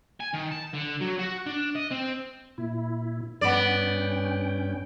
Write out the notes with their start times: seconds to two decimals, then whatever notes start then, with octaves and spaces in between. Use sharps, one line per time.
0.20 G#5
0.33 D#3
0.51 A5
0.73 D3
1.00 F#3
1.19 F#4
1.46 D4
1.75 D#5
1.91 C4
2.58 A#2 E4
3.41 G2 B3 C#4 D5 G5